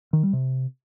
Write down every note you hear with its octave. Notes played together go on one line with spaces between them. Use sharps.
D#3
G3
C3